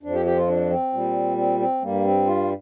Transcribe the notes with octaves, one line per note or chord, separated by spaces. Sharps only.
F2 F3 D4
G4
G4
F4
D4
C4
A#2 G3
C4
C4
G2 G3 A#3
C4
F4